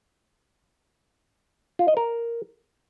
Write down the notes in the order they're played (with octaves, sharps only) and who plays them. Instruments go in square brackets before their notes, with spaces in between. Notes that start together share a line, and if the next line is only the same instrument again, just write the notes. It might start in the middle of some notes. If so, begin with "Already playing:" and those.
[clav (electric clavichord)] F4
D#5
A#4